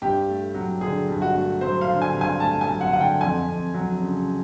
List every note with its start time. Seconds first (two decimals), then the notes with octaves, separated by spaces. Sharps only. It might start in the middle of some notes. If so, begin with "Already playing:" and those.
0.02 G2 G4
0.29 A3
0.54 F#3
0.81 D3 G#4
1.08 G2
1.22 F#4
1.35 A3
1.61 F#3 C5
1.81 F5
1.88 D3
2.02 G#5
2.14 G2
2.21 G#5
2.40 A3 A5
2.61 G#5
2.68 F#3
2.81 F#5
2.93 D3 F#5
3.01 G5
3.21 F2 G#5
3.47 F2
3.74 F#3
4.01 C#3